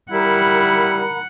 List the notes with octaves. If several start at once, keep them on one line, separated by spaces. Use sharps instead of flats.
G3 E4 A#4 F#5 A#5 B5